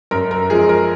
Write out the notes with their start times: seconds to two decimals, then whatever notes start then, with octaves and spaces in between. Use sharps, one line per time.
0.11 F#2 A#4
0.31 A#4
0.50 F3 G#3 G#4
0.69 A#4